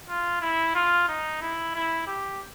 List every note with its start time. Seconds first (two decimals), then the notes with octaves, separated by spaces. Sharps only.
0.08 F4
0.41 E4
0.75 F4
1.09 D#4
1.42 E4
1.75 E4
2.07 G4